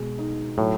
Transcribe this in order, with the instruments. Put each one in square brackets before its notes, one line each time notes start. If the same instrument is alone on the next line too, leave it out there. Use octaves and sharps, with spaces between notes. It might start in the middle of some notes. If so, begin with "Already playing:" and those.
Already playing: [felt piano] B2 G#3
D#4
[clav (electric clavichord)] A2 [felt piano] F#3